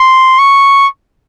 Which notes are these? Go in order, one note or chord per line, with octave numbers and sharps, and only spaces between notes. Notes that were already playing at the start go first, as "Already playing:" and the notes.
Already playing: C6
C#6